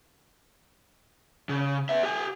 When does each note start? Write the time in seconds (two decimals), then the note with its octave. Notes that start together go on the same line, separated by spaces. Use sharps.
1.49 C#3
1.89 B3 E5
2.03 G4 G#5